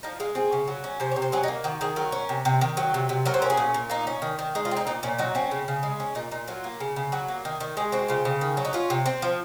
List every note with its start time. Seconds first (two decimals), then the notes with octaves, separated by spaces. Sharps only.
0.03 F3 D#4
0.20 G#3 F4
0.35 C4 G#4
0.53 C#3
0.68 F#3
0.84 C#4
1.00 C3 C5
1.11 C#5
1.16 C3
1.22 C5
1.32 F#3 G#4
1.43 D#4
1.48 A#3
1.64 D#3 F#4
1.81 D#3 G#4
1.96 F#3 A#4
2.12 C#4
2.29 C3
2.45 C3
2.61 D#3
2.77 F#3
2.94 C3
3.09 C3
3.26 F#3 A#4
3.34 C5
3.42 C#4 A#4
3.50 G#4
3.57 A#2
3.74 A#2
3.90 A#3 D#4
4.07 C#4
4.22 D#3
4.39 D#3
4.55 G#3 D#4
4.65 F4
4.71 C4
4.77 D#4
4.87 A#2 D#4
5.03 A#2 C#4
5.19 F#3 D#4
5.35 C4 C#4
5.51 C#3
5.68 C#3
5.83 G#3
6.00 C#4
6.15 A#2 D#4
6.32 A#2 D#4
6.48 F#3 F4
6.64 A#3
6.80 C#3
6.96 C#3
7.12 F#3 F#4
7.28 A#3
7.45 D#3
7.61 D#3
7.77 G#3 G#4
7.92 C4 F#4
8.08 C#3 F4
8.25 C#3
8.41 D#3
8.57 F#3
8.65 D#4
8.73 C#4 F4
8.90 C3
9.06 C4
9.22 F3